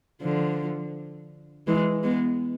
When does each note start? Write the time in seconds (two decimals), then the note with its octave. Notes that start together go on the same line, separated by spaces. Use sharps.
0.22 D3 F3
1.67 E3 G#3
2.03 G#3 B3